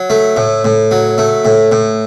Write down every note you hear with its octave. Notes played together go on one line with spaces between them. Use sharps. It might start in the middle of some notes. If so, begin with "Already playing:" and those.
Already playing: F#3
A3
A2
A2
F#3
A3
A2
A2